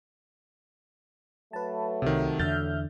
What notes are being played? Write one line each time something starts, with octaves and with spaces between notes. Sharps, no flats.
F#3 A3 B4 A5
C2 C3 D#3
E2 D3 E5 F6 G6 A6